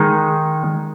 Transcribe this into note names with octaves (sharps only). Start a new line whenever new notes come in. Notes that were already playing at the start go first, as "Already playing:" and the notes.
Already playing: D#3 G#3 D#4